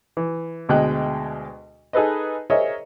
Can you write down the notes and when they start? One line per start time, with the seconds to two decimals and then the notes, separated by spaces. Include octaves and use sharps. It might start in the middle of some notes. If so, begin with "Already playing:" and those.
0.17 E3
0.69 D2 B2 G#3 G5 F#6
1.93 D#4 G#4 A4 B4 D#5
2.50 G#4 A#4 C5 C#5 D#5 E5